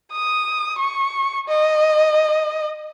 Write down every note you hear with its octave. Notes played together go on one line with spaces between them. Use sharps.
D#6
C#6
D#5